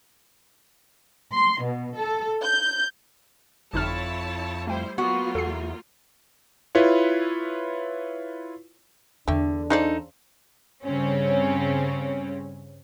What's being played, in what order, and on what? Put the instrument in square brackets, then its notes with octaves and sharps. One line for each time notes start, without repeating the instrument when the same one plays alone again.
[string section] C6
B2
A4
G6
[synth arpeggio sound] G1 D#4 F6 [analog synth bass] F2 [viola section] E4 C#5 A5
[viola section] G3 E4 C5 [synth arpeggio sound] A3 G5
[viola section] F#3 A#3 F4 [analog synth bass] B3 [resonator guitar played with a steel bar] F#4
[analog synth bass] E2 [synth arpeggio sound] A4 C7
[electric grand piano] E4 F4 B4 C#5
[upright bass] E2 [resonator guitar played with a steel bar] D3 [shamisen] A3 G5 [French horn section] D4
[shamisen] C#3 C5 D5 [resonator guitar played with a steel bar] D#4 A4
[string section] G2 C#3 C4 C#4